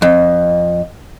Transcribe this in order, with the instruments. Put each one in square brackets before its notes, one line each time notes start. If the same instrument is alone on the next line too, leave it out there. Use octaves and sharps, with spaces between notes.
[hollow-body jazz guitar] F2